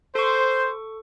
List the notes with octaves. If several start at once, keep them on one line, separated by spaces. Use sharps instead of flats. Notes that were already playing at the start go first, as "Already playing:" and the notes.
A4 C5 C#6